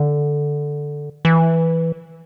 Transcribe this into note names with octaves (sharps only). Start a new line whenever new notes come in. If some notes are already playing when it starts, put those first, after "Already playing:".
Already playing: D3
E3